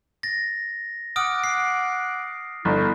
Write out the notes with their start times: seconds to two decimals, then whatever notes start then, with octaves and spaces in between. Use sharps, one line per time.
0.23 A6 A#6
1.16 F#5 D6 D#6 F6 D7
1.44 C7
2.65 G1 B3 E4